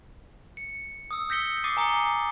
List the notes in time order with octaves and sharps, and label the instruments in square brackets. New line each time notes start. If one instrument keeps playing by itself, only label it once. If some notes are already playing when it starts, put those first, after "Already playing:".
[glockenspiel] C#7
D#6 E6
E6 G6 A#6 B6 C#7 G7
D6 D#6 A6 C7 D#7
G#5 A#5 D#6 A6 C#7 G7